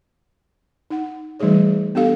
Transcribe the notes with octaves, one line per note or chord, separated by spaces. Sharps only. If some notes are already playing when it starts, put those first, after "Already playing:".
D#4 F#5
E3 G3 A3 D#4 G#4 C#5
B3 D4 G4 A4 F5